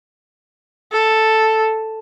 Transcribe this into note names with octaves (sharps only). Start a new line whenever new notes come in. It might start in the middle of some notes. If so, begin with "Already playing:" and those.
A4